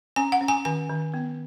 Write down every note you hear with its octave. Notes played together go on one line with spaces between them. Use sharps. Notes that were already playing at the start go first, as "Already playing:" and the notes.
C#4 G#5
F#5
C#4
G#5
D#3 G#5
D#3
B3